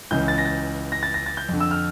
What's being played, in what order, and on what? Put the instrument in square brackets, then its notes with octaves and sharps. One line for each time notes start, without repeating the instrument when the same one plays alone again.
[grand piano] C#2 C#3 E3 G6
A6
A#6
A6
A#6
A6
A#6
A6
G6
F2 D3
E6
F6